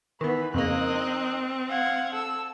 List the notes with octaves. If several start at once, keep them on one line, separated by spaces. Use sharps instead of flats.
D#3 E3 B3 B4
F2 C#3 A#3 C4 D#4 D#5 F#6
F5 F#5 G#6
A4 E6